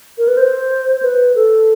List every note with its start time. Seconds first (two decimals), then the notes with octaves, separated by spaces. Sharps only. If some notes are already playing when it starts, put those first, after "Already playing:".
0.18 A#4
0.28 B4
0.37 C5
1.02 B4
1.35 A4